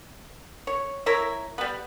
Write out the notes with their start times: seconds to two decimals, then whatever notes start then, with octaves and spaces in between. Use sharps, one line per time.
0.67 C#5
1.06 E4 A#4 C#5 E5
1.58 G3 B3